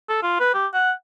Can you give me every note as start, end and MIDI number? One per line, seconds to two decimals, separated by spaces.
0.09 0.18 69
0.23 0.37 65
0.40 0.53 71
0.54 0.66 67
0.74 0.91 78